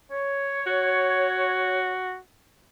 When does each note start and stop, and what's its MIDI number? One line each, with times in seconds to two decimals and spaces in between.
0.12 1.93 73
0.67 2.18 66